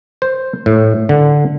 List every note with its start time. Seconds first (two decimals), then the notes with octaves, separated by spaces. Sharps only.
0.22 C5
0.66 A2
1.09 D3